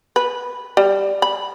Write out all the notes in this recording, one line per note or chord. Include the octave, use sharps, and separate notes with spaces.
B4
G3
B5